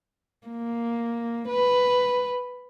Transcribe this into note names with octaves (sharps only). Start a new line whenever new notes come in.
A#3
B4